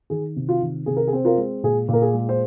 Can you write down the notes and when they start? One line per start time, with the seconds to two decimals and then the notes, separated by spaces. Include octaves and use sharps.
0.10 D#3 G#4
0.36 C3
0.49 F4
0.61 D#3
0.86 C3 G#4
0.97 A#4
1.08 G#4
1.13 C4
1.25 F4 A#4
1.38 G#3
1.63 A#2 G#4
1.89 A#2 A#4
2.02 G#4
2.14 G#3
2.29 C5